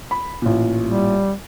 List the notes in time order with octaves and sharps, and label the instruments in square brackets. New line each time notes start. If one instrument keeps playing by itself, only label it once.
[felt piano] B5
A1 A#2
[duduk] G3